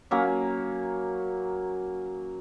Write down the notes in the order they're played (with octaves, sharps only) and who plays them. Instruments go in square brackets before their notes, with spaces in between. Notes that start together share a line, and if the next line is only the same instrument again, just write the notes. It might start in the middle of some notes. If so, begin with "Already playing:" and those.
[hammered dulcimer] F#3 A#3 C#4